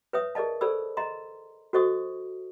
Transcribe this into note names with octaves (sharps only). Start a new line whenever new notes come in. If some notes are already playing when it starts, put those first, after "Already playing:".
B4 C#5 E5 D#6
G#4 A#4 D5 D#5 A5
G#4 A4 C5 D5 B5 E6
D#5 A#5 C6
F#4 A4 C5 D#5 C#6 D#6